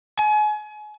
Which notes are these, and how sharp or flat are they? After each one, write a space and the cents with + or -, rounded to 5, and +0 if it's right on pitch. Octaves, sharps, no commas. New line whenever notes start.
G#5 +35